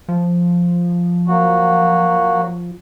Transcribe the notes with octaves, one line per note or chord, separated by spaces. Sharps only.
F3
F#3 A#3 F#4